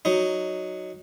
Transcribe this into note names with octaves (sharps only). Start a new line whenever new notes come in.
F#3 D#4